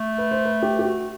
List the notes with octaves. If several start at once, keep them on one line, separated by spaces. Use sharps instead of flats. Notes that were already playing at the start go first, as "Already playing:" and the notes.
Already playing: A3
B4
C5
B4
G4
G4
F#4